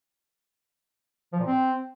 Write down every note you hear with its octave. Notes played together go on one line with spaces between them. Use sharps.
F3
A#2
C4